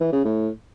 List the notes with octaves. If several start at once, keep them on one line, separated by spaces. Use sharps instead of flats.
E3
C#3
A2